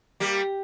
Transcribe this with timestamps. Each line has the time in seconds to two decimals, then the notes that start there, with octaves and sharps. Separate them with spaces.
0.20 G3 A#3 G4